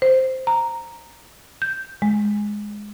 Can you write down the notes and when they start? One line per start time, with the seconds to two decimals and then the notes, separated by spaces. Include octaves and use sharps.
0.02 C5
0.47 A#5
1.62 G6
2.02 G#3